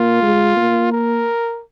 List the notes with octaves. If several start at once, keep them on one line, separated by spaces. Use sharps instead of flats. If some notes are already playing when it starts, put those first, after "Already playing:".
Already playing: A#3 F4
G#3
A#3
A#4